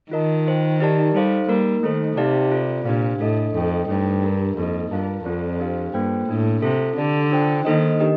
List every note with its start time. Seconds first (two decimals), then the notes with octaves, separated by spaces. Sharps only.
0.11 D#3 F4 A#4 D#5 A5
0.46 F4 C5 G5
0.80 D#4 G4 A#4 D5 A5
1.14 G3 D#4 A4 C5 F5
1.48 G3 A#3 D#4 A#4
1.83 D#3 A3 D#4 A4 C5
2.17 C3 D#4 G4 D5 F5 A5
2.52 F4 A4 D5
2.85 A#2 D4 G4 C5 F5
3.20 A2 D4 A4 D#5
3.54 F2 D#4 A4 D#5 G5
3.88 G2 A3 D#4 A4 C5 G5
4.23 D4 G4 A#4
4.57 F2 A#3 D#4 A4 D#5
4.91 G2 F4 A#4 F5 A5
5.25 F2 C4 F4 A4 D5
5.60 D4 G4 C5 F5
5.94 G2 A#3 F4 A4 C5 G5
6.28 A2 A#3 D4 A4
6.62 C3 C4 F4 A4
6.97 D3 G4 D5 A5
7.31 D4 F4 C5 G5
7.65 D#3 A#3 D#4 A4 C5 D#5
8.00 D4 G4 A#4 D#5